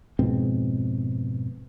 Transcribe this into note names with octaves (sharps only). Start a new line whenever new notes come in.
F2 G#2 B2 C4